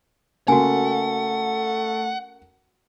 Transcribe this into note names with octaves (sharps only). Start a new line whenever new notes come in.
C#3 A3 A#3 F#4 F#5 G#5